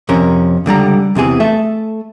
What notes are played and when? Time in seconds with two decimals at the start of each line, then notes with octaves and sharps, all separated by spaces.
0.09 F2 C3 C#4 A#4
0.66 C#2 D3 G3 A#5
1.15 E2 C3 E3 G#4
1.40 A3 A4 E5